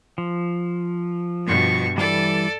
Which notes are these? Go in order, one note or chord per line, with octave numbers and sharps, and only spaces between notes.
F3
G2 B2 C#6
E3 G3 A4 D5